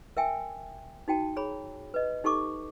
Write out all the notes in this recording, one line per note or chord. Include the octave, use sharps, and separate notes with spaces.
A#4 E5 G5 G#5
D#4 F#4 G5 A5
G#4 C#5 A#5 B5
B4 D#5
D#4 G4 A4 C#6 D6